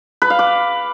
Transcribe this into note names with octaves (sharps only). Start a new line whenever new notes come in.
B4
F5
D6